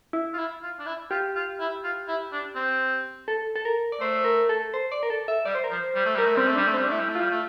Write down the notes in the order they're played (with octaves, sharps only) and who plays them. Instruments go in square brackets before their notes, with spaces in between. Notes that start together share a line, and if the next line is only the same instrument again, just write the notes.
[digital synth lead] E4
[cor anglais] F4
E4
F4
D4
E4
[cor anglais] F4 [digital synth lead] G4
[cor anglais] F4
E4
F4
E4
D4
C4
[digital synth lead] A4
A4
A#4
D5
[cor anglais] A3 [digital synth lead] C5
[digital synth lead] A#4
A4
C5
D5
A#4
A4
E5
[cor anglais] G3 [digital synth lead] D5
[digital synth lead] C5
A#4
[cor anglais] F3
[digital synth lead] C5
[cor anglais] G3
A3
[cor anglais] G3 [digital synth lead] A#4
[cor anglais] A3
[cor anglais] G3 [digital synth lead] C4
[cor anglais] A3
[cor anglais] G3 [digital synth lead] D4
[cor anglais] A3
[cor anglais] G3 [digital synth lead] C4
[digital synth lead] D4
[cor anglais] A3 [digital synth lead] E4
[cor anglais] G3
A3
[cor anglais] G3 [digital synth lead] F4
[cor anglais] A3